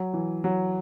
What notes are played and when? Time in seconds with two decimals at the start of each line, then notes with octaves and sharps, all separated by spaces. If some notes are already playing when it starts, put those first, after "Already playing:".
Already playing: F#3
0.13 E3
0.44 F#3